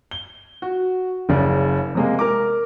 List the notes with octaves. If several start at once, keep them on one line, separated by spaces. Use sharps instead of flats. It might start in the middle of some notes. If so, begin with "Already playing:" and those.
G7
F#4
F#1 C#3 D5
C3 G#3 A#3
A#4 A#5 D6